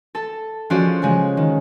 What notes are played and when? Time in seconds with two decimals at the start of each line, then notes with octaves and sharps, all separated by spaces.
0.15 A4 A5
0.70 F3 G#3 C#4 F#4 C5 D5
1.02 C#3 F3 G#3
1.37 D#3